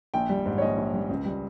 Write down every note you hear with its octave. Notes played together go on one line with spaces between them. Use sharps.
A#1 G5
G3
G#2
C#5
A#1 D#5
A#1
G3
C#2
G3